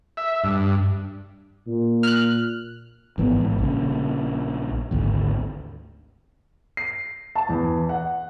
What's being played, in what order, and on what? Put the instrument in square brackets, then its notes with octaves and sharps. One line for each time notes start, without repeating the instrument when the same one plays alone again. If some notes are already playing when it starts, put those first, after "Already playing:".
[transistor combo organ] E5
G2
[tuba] A#2
[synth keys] F6 F#6
[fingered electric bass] G#1 E3 B3
A1 G#2
A#1 C#3
G#1 D2
[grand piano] C7
A5
E2
F#5